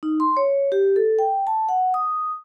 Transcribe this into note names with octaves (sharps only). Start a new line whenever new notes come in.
D#4
C6
C#5
G4
A4
G5
A5
F#5
D#6